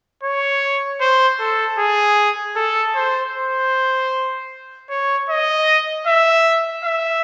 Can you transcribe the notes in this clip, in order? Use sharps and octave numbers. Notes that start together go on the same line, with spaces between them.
C#5
C5
A4
G#4
A4
C5
C5
C#5
D#5
E5
E5